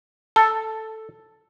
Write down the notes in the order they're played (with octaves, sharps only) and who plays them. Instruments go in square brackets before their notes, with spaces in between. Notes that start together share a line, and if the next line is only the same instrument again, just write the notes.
[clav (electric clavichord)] A4 [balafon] A5